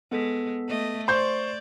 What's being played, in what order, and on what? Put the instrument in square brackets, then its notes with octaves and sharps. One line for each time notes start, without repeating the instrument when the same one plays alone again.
[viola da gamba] G#3 [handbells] B3 A4 B6
[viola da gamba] A3 D#5
[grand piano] C5 G6 [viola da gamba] D5 [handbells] C#6